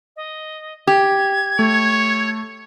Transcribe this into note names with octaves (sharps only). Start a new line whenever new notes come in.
D#5
G4 G#6
A3 C#5